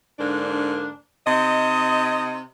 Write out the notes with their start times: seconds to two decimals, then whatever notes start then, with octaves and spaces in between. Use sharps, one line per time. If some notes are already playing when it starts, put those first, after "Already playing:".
0.18 G#2 D3 A#3 D4
1.27 C3 D#4 D#5